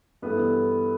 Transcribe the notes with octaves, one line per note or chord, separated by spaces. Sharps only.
G2 E3 A3 B3